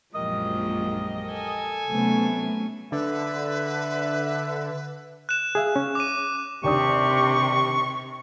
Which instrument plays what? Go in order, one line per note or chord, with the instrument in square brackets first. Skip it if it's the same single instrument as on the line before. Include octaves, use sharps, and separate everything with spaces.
[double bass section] A#1 F#2 [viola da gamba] F3 F#3 G#3 [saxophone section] G4 A#4 D#5
[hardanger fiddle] A4 G#5
[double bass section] C3 A3 B3 [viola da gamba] F#3 C#4
[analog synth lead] D3 [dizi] B4 [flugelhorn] E5
[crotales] F#6 E7
[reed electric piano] G#4 E5 F5
C#4
[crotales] D6 D#7
[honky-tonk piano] D#2 D4 D#6 [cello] C3 [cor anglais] G4 [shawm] C#6